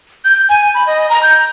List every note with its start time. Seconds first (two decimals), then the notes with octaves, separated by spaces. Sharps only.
0.25 G6
0.49 G#5
0.75 B5
0.87 D#5
1.10 A#5
1.23 G6